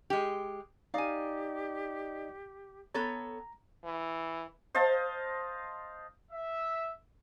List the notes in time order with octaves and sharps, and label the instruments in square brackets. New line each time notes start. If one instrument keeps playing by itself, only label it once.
[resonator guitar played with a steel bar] G#3 G4
[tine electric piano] D#4 D5 D#5 [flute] G4 [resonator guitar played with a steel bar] F5 G#5
[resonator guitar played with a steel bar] B3 A4 C#5 [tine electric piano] A#5
[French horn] E3
[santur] C5 D#5 F5 A5
[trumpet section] E5